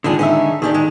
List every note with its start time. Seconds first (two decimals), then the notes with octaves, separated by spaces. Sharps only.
0.04 F2 D3 D#3 G#3 D4 G#4
0.19 C#4 D#4 E5
0.62 D#3 D4 G4 G#4
0.74 G#3